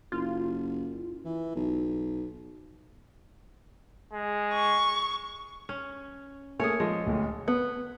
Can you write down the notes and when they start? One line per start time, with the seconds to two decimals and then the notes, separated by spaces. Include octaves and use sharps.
0.12 F#1 F4
1.25 E3
1.55 B1
4.13 G#3
4.54 C#6
5.69 C#4
6.59 A3 A#3 G#4 C#5 G#5
6.80 F3 G#3
7.06 D1 D2
7.48 B3